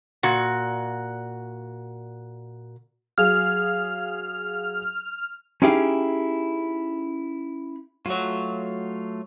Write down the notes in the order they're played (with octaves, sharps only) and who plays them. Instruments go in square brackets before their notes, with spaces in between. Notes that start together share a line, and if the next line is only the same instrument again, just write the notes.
[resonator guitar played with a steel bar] A#2 F#4
[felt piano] F#3 G#4 F5 [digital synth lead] F6
[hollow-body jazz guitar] C#4 D#4 E4 G4 G#4 F5
[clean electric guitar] F#3 C#5 [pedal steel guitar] A3 F4